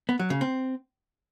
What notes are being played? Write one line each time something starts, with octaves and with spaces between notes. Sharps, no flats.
B3
F#3
C#3
C4